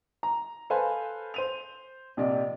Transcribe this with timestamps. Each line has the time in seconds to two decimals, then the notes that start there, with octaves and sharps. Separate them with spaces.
0.23 A#5
0.70 A4 B4 C5 F5 G#5
1.34 C5 D#7 F7
2.17 A#1 C3 D5 D#5